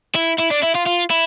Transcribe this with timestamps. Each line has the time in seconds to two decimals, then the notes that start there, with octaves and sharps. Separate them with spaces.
0.16 E4
0.39 E4
0.51 D4
0.63 E4
0.75 F4
0.87 F4
1.11 E4